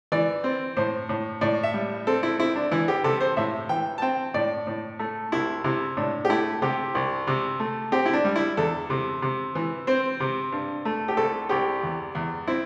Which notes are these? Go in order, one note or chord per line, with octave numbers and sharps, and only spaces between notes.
E3 D5
C4
A2 C5
A2
A2 D5
E5
G3
C4 A4
E4
C4 E4
D4
E3 E4
G4
C3 A4
C5
A2 E5
E3 G5
A5
C4 G5
A2 D5
A2
A3
C2 E4
C3 E4
A2 D4
G4
A3 E4
C3 G4
C2
C3
A3
C4 G4
E4
D4
G3
E4
E2 A4
C3
C3
E3
C4 C5
C3
G2
A3
G4
C2 A4
C2 G4
E2
E2
C4 E4